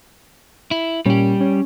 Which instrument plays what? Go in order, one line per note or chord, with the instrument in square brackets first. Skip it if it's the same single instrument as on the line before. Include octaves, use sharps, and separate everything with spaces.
[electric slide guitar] E4
[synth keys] A#2 C#4 [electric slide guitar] G3 G4
[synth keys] C#4